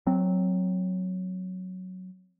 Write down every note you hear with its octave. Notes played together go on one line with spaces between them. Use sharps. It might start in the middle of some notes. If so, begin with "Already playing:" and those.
F#3 C4